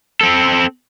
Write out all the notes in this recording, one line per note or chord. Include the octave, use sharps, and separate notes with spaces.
C4 A4